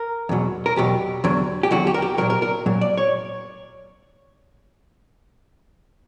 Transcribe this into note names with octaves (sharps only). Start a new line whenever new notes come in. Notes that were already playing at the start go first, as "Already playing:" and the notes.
Already playing: A#4
E2 B2 F#3
A#4
E2 B2 F#3 G4
E2 D3 F#3
G4
E2 D3 F#3 F#4
G4
A#4
G4
A#2 F#3 A#4
A#4
A#4
A#2 F#3
D5
C#5